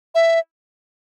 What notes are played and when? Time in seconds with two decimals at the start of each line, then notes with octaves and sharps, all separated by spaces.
0.15 E5